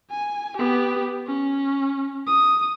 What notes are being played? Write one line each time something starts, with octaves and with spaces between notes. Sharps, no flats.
G#5
B3 G4
C#4
D#6